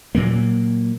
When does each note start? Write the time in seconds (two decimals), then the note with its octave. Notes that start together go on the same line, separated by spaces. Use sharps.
0.15 A#2 F#3 A#3